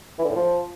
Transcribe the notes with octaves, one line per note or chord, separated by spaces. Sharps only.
E3
D3
A2
F3